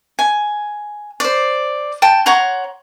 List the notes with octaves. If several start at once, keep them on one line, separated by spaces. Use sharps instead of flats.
G#5
C5 D5
G5 A5
C#5 F#5 A#5 C6